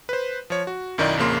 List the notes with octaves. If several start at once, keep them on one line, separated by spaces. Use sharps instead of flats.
B4 C5
F3 C#5
F#4
B1 F#2 D#3 D#4 E4 D5
A#1 F2 C#3 A#3 C6